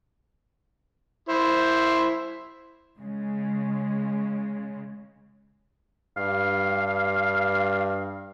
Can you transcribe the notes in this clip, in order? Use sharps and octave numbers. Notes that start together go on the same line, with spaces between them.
E4 C5
C#3 G#3
G2 F5